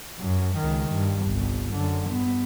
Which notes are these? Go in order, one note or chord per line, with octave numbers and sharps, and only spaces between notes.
F#2
C#2 D#3
G2
G1 C2
F#2 D3
G2 B3